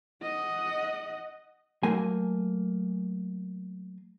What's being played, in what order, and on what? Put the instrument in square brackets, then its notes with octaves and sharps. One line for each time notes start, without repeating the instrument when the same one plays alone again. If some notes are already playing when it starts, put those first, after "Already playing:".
[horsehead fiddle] D#5 F#5
[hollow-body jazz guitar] F#3 A3 A#3 G#5